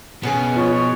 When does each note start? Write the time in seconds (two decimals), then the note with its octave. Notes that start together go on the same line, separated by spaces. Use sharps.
0.23 B2 B3 C#4 G#4
0.56 F3 C#5